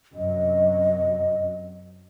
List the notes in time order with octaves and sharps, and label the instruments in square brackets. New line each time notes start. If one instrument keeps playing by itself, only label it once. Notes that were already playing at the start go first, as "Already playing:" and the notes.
[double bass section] F#2 C3 F#3 [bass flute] D#5